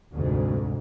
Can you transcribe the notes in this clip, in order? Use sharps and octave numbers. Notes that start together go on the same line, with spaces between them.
F1 D2 G#2